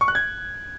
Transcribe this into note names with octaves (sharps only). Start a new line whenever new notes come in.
C#6
F#6
G#6